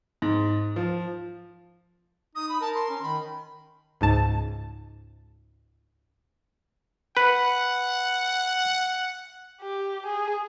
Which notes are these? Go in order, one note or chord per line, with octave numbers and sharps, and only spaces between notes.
G#2
F3
D#4 D#6
B5
A#4 A5
C6
C#4
D#3 B5
C#2 G#2 A5
B4 F#5
G4
G#4